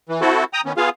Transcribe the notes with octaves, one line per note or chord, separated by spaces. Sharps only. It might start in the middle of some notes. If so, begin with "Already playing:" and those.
E3
C4 E4 F#4 A4
G5 A#5 D#6
D#3 B3 C#4
B3 F4 G#4 F5